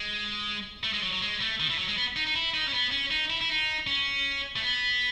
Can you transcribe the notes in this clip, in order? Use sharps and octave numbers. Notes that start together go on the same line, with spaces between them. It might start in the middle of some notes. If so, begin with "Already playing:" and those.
Already playing: G#3
A3
G#3
F#3
F#3
G#3
A3
D#3
E3
F#3
G#3
B3
D#4
D#4
E4
D#4
C#4
B3
C#4
D#4
E4
E4
D#4
C#4
A3
B3